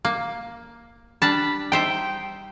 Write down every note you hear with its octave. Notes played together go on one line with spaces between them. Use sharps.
A#3
G3 D4 A5 B5
D#4 C5 E5 G5